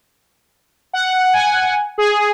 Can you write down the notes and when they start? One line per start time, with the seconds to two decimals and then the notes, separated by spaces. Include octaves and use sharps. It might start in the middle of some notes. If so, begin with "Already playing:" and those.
0.93 F#5
1.33 G#5
1.98 G#4